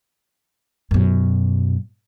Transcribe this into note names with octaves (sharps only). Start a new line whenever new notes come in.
F#2 B2